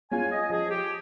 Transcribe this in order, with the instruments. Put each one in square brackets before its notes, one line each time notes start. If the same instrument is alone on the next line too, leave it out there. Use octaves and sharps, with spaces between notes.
[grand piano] G#3 C#4 F4 [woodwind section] G#5
[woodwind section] D#5
[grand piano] F3 [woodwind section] G#4
[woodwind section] G4